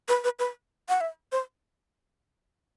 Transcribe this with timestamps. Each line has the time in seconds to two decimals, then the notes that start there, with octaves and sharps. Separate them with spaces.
0.08 B4
0.24 B4
0.39 B4
0.89 F#5
1.01 E5
1.32 C5